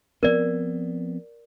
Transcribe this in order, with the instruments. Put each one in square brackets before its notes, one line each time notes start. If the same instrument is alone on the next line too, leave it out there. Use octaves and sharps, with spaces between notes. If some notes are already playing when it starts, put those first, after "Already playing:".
[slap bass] F3 B3 C4 [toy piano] A#4 D5